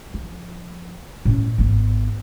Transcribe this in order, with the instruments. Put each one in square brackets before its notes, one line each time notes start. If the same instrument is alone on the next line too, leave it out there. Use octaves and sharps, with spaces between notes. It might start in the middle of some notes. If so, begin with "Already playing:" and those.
[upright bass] F3
A2 C#4
G#1 B3